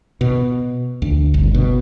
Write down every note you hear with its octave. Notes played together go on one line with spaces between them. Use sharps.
B2
D2
G1
B2